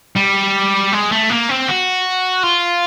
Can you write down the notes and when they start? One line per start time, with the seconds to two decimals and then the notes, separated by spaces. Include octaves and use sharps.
0.16 G3
0.93 G#3
1.11 A3
1.29 A#3
1.49 C4
1.68 F#4
2.43 F4